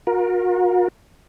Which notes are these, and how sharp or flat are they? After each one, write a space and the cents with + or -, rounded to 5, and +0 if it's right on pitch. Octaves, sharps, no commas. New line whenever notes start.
F#4 -45 A#4 +20